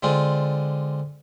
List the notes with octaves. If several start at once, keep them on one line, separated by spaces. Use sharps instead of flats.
D3 G#3 C4 D4 F4